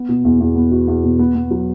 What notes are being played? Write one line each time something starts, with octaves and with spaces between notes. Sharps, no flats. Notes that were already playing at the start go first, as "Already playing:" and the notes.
Already playing: B3
B2
E2
E2
B3
F#4
E2
B2
B3
B3
F#3